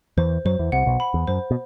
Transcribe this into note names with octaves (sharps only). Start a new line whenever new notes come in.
E2 E3 C5
F#2 F#3 C5
E2 E3
C2 C3 F#5
B1 B2
B5
E2
F#2 C5
B2